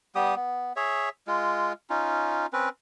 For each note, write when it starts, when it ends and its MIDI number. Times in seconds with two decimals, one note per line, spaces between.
0.15 0.35 55
0.15 0.35 59
0.15 0.35 67
0.15 0.35 87
0.36 0.73 59
0.76 1.09 68
0.76 1.09 73
0.76 1.09 76
1.27 1.73 56
1.27 1.73 65
1.90 2.46 61
1.90 2.46 63
1.90 2.46 65
2.53 2.69 60
2.53 2.69 61
2.53 2.69 71